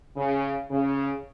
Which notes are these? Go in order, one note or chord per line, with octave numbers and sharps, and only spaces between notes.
C#3
C#3